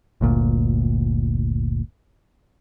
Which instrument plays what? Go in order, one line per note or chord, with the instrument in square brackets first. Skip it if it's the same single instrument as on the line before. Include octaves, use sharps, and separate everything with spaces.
[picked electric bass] G1 D2 A#2